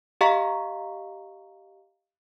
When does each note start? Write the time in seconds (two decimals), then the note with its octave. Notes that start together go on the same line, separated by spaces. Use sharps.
0.21 G4 D#5 F5 A#5 C#6 B6